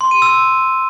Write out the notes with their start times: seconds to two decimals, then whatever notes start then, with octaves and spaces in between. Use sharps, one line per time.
0.01 C6
0.11 D#7
0.22 E6